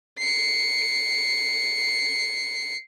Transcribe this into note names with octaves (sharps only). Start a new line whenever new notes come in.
C7 C#7